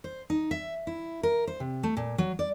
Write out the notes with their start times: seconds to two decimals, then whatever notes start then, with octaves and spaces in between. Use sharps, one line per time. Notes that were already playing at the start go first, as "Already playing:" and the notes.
0.04 C5
0.30 D#4
0.51 E5
0.87 E4
1.23 A#4
1.47 C5
1.60 C3
1.83 A3
1.97 A#2
2.18 F#3
2.39 D5